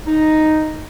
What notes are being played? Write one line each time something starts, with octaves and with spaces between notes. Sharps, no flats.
D#4